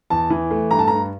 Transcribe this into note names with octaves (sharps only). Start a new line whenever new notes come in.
E2 A5
E3
A3
G2 A#5
A5
G2 A#5